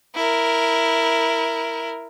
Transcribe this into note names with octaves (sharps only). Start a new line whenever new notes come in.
E4 A#4